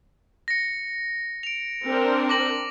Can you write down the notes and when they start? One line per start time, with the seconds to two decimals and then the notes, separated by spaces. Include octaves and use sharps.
0.48 A#6 C#7
1.43 D7 F7
1.87 C4 D4 A#4
2.29 D6 A#6 F#7